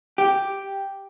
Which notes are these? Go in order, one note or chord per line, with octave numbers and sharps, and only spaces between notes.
G4